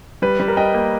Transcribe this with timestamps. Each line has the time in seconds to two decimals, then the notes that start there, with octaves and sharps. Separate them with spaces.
0.22 G3 B4
0.40 G3 B4
0.48 A#4
0.57 G3 D#5 G5
0.74 A#3